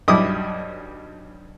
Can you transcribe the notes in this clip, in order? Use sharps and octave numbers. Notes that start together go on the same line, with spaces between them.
B1 G2 E4 D6 D#6